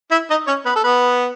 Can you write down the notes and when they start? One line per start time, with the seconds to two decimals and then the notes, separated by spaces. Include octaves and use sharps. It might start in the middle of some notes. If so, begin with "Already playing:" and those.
0.11 E4 E5
0.30 D#4 D#5
0.47 C#4 C#5
0.65 B3 B4
0.76 A4
0.84 B3 B4